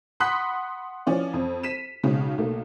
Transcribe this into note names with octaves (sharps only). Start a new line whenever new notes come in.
F#5 B5 C6 D#6 F#6 B6
E3 F3 C#4 D5
F2
B6 D#7 E7
B1 C#3 G#3
B1 A3 A#3